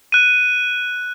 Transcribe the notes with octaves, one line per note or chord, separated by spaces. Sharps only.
F#6 D#7